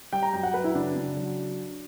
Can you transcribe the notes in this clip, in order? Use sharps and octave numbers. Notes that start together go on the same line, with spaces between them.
G3 G5
A#5
F#2 G5
F#5
F#2 B4
E4
C#3 D4
C#3
F#3